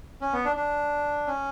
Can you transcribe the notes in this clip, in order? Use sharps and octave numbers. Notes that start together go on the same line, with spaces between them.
C#4
B3
D4
D4
C#4